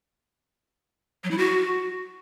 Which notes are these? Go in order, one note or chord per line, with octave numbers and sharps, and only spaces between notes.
F#3
E4
F#4